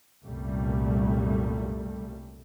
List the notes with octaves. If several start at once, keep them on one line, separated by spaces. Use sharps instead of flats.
C2 F#2 A#2 G3 A3